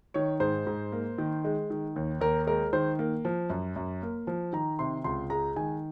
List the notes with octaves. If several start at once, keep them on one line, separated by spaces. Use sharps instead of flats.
D#3 C#5
G#2 C5
G#2
A#3
D#3
G#3
D#3
D#2
D#2 A#4
G#3 A#4
D#3 C5
A#3
F3
F#2
F#2
A#3
F3
D#3 A#5
C3 C6
C#2 C6
G#3 A#5
D#3 G#5